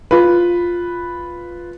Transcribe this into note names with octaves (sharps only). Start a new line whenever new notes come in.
F4 B4